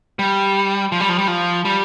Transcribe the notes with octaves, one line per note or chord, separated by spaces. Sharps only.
G3
F3
G3
F3
G3
F3
G3